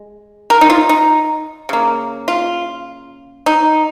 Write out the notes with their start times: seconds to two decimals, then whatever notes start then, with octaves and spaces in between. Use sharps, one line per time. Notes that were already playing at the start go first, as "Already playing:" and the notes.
Already playing: G#3
0.50 A#4
0.61 D#4
0.70 F4
0.89 D#4
1.69 C#3 A#3
2.28 F4
3.46 D#4